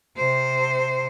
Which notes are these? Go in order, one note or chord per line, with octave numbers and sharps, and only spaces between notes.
C3 C5